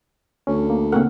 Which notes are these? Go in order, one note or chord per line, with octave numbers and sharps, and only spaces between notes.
D2 C#4
A#3
C#3 A#3 C4 A#4 F#5